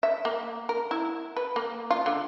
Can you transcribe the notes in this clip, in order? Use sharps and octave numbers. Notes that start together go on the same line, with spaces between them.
E5
A#3
A#4
E4
B4
A#3
F4
D3